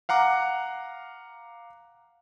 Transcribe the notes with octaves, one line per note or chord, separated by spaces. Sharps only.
F5 F#5 A#5 D6